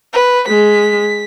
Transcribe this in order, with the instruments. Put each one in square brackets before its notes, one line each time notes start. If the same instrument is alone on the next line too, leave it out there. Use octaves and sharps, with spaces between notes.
[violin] B4
[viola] G#3 [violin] B6